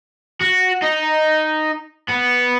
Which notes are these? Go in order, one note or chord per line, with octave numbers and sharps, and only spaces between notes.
F#4
D#4
B3